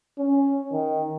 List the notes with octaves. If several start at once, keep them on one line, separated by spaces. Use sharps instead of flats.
C#4
D#3